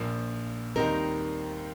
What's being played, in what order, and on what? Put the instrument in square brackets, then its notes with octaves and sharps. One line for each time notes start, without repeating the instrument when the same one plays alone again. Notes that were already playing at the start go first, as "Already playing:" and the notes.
Already playing: [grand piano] A#1 A#2 F3
[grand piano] D#2 D#3 G3 C4 D#4 [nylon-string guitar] A#4